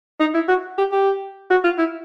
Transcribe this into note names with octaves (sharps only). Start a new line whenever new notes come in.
D#4
E4
F#4
G4
G4
F#4
F4
E4